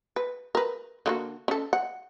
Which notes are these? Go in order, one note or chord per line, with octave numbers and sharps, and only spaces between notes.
B4
A#4 B4
D3 A#3 F#4
C#4 A4
F#5